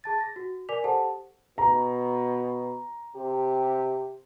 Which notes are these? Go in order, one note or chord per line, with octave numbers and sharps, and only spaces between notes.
G#4 A5 A6
A6 A#6
F#4
A#4 D5 G#5 D6 B6 F7
G4 A4 C5 F#5 A5
B2 A#5
C3 G4